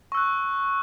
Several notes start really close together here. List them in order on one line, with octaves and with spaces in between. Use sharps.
C#6 E6 F#6